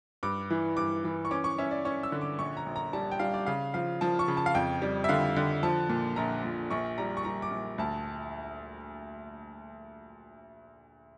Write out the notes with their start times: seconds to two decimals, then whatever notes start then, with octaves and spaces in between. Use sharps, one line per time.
0.23 G2 D6
0.50 E3
0.77 G2 D6
1.04 E3
1.25 C#6
1.31 C#4 D6
1.44 C#6
1.58 C#4 E5
1.71 D5
1.85 C#4 C#6
2.03 E6
2.12 D3
2.21 D6
2.39 A#1 C#6
2.57 A#5
2.66 A#1
2.76 A#5
2.93 G3 A5
3.11 G5
3.19 G3 F5
3.34 D5
3.46 C#3 F5
3.74 F3 F5
4.01 F3 A5
4.19 C#6
4.28 C#3
4.37 A5
4.46 F5
4.55 F2 G5
4.82 G3
5.04 E5
5.09 D3 F5
5.37 D3
5.63 F3 A5
5.89 A#2
6.16 A#1 A#5
6.44 A#2
6.71 A#1 C#6
6.98 G3 A#5
7.17 C#6
7.24 G3 A#5
7.42 D6
7.51 A#1
7.78 D2 A5